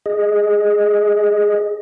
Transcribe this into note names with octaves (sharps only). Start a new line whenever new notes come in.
G#4 D#5